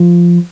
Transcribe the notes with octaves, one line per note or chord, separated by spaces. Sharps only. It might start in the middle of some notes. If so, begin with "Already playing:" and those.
Already playing: F3